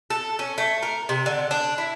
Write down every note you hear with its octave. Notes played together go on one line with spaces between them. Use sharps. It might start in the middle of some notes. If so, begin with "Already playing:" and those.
A4
C#4
A3
A#4
C3
D3
D4
E4